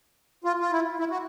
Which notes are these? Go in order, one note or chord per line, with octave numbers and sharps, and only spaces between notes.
F4
F4
E4
E4
F#4